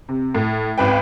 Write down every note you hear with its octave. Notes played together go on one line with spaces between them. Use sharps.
C3
A2
G#1 C#2 B4 G5